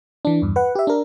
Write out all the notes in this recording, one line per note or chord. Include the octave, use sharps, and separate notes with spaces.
E3 D4
E2 G2
B4 F#5
G4 E5
D4 A#4